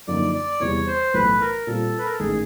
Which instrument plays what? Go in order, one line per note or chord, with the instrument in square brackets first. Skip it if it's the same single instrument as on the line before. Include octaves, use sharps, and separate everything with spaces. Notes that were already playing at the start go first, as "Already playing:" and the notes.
[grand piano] F#2 D3 F3 A#3 D#4 [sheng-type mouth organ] D5
[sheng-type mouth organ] D5
[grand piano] E2 C3 E3 G3 [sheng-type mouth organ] C#5
[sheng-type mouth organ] C5
[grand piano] B1 A2 E3 A3 [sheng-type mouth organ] B4
[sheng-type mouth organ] A#4
[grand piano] A#2 G3 C4 F4 [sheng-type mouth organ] A4
[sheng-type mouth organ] B4
A#4
A4
[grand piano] A1 G#2 D#3 [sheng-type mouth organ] G#4